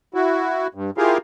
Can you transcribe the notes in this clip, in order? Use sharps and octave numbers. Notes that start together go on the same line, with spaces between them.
E4 F#4
G2
E4 F4 G4 G#4 A#4 F5